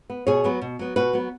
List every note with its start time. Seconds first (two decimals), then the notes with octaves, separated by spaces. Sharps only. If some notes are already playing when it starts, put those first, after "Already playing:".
0.10 B3
0.27 B2 G#4 C#5
0.44 F#3 B3
0.62 B2
0.79 F#3 B3
0.96 B2 F#4 B4
1.13 F#3 B3